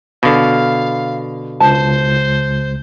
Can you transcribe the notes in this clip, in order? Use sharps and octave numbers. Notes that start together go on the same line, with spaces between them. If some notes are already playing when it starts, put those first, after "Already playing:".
B2 D3 F5
C#2 C5 A5